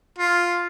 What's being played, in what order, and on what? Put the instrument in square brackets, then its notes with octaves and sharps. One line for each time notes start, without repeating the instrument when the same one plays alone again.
[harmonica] F4